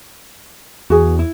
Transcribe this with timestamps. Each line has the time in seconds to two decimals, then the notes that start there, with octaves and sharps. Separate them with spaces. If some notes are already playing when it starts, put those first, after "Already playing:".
0.90 E2 F#4 G#4
1.19 E4